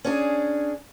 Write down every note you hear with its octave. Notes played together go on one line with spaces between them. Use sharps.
C#4 D4 G#4